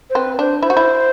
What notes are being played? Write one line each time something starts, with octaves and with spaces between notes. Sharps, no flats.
C5
C4 B4
D4 C5
E4 C5
F#4
E4